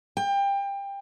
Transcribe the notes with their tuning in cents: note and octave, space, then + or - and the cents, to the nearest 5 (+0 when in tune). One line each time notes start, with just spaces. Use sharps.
G5 +25